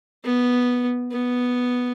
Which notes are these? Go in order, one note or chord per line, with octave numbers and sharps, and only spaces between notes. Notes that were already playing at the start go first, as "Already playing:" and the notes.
B3
B3